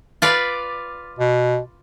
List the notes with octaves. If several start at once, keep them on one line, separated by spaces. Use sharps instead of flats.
F4 B4 D5
B2